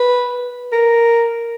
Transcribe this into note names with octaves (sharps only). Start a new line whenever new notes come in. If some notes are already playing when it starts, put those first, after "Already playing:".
Already playing: B4
A#4